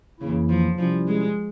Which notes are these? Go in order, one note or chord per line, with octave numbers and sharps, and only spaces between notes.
F2 C#3 E3 A#3 E4
F3
C3 F3 G3 C#4 E4
G#3